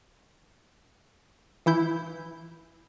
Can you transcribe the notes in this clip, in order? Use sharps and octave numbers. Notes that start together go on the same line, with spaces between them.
E3 E4 G6